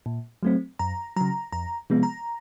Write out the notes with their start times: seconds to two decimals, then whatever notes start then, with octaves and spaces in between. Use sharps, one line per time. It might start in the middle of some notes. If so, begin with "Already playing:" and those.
0.06 A#2
0.43 F#3 A3 C4
0.79 F#2 A#5
1.16 C#3 F#3 A#5
1.52 F2 A#5
1.90 C3 F3 G#3 B3
2.03 A#5